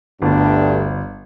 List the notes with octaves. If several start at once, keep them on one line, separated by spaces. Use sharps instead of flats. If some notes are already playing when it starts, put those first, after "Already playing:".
G1 D2 G2 D4